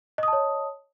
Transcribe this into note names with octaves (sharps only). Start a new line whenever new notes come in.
C#5 D#5 A5 D#6